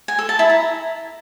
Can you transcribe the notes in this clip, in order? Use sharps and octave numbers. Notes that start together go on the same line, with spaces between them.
G#5
A4
A5
E4
A#5